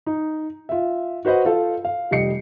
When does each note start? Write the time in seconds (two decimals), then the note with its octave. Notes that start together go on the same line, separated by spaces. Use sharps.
0.06 D#4
0.69 F4 E5
1.25 F#4 B4 C5 D#5 F#5
1.45 F4 A4 F5
1.85 F5
2.11 F1 G3 D#5 C7 C#7